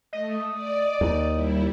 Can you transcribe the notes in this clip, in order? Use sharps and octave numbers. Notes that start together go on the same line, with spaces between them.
A3 D#5
D5
D#2
G3 E4